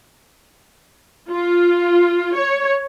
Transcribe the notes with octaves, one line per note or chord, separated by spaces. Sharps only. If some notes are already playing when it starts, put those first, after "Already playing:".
F4
C#5